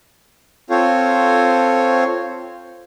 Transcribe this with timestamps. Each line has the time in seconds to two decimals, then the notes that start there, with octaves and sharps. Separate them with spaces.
0.70 C4 F4 A4 C5 C#5